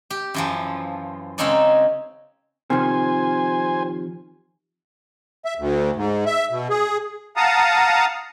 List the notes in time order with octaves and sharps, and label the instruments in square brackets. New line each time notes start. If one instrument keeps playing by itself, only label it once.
[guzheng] G4
F#2 E3 F3
C#3 G#3 C4 C#4 D#4 D5
[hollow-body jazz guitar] C3 D#3 F3 [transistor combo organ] C5 G#5
[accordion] E5
D2
G#2
E5
B2
G#4
F5 F#5 A5 A#5 D#6